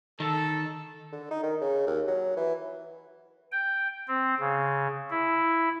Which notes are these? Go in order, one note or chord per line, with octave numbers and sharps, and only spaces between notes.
D#3 A4 A5
D3
D#4
D#3
C#3
D#2
F#3
E3
G5
C4
C#3
E4